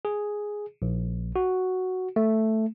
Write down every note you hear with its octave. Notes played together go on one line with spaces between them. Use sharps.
G#4
A#1
F#4
A3